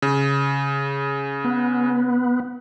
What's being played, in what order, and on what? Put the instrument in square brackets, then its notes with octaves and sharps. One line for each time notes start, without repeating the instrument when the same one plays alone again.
[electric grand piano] C#3
[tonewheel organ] B3